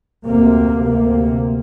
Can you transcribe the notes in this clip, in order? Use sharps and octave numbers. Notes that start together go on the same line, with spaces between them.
D2 C3 A#3
D2 C3 A#3